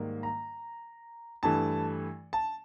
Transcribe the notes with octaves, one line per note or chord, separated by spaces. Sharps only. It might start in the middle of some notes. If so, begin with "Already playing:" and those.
Already playing: G#2 D#3 G3 A#3
A#5
G2 E3 A3 A5
A5